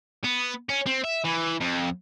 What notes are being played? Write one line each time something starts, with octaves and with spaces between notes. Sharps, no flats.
B3
C#4
C4
E5
E3
F2